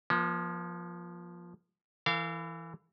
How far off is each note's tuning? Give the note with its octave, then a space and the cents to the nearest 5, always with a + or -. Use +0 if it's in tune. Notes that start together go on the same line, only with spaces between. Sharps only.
F3 +0 A#3 +45
E3 +10 A#4 -40 F5 -20